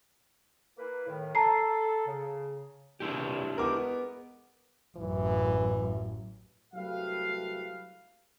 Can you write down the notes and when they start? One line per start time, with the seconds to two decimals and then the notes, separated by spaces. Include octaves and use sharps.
0.78 A#3 E4 B4
1.08 A2 D#3
1.35 A4 A5 A#5 C7
2.07 C#3
3.00 E2 A#2 G3 D4 E4 G4
3.58 G#3 B3 A#4 D6
4.97 A1 F#2 E3
6.74 C2 F#3 A3 G4 B4 F5